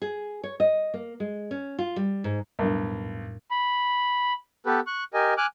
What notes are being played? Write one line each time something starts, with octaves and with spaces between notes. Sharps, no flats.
G#4
C#5
D#5
A#3
G#3
C#4
F4
G3
G#2
B1 F2 A2 G3 D4 A#4
B5
B3 G4 A4 B4
C#6 F#6
G4 A#4 D#5 G#5
G#5 D6 F6 F#6